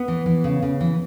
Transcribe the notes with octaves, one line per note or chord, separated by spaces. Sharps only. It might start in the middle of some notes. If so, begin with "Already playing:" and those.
Already playing: B3
E3
E3
C#3
C#3
E3